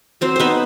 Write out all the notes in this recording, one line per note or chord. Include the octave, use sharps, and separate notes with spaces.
F#3 C4 C5
B3 D#4 B4 C5